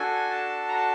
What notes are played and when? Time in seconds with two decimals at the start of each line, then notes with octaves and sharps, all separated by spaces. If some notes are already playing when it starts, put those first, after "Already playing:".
Already playing: D4 F#4 A4 G#5
0.30 A5
0.68 A#5
0.75 A5